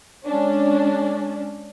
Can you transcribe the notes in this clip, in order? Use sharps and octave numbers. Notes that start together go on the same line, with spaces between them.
G#3 C#4 D4